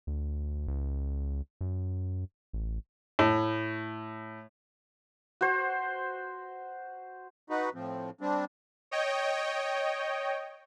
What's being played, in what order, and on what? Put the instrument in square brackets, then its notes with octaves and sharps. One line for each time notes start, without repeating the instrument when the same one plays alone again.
[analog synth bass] D2
C#2
F#2
A1
[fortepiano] A2
[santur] F#4 C5
[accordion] D#4 F#4 B4
A2 F3 C4
G3 C4 D4
[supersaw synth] C#5 D#5 G5